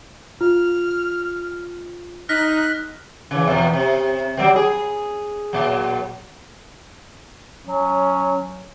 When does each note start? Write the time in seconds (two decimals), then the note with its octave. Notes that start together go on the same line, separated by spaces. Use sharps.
0.41 F4 F6
2.29 D#4 F6 F#6 A#6 B6
3.31 C#3 E3
3.48 E2 B2
3.73 C3
4.37 F#3 G3 C4
4.56 G#4
5.53 A#2 F#3
7.67 F#3 C#4